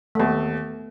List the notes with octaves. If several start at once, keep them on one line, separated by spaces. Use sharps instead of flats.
A3
D#2 B3